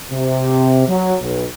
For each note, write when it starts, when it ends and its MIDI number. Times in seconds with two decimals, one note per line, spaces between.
0.11 0.83 48
0.88 1.15 54
1.20 1.43 35